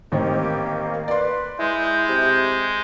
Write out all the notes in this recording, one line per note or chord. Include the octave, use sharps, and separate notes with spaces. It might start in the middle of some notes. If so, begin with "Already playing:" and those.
A1 D#3 A#3 C4 G4
B4 D5 C6
G#3 E4 G6
C3